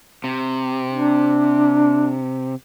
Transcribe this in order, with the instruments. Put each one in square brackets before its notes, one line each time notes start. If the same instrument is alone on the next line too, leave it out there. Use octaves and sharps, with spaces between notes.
[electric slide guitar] C3
[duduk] D4